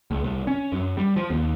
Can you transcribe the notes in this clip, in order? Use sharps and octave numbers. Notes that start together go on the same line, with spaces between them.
C#2
C2
C#4
F#2
G3
F3
D#2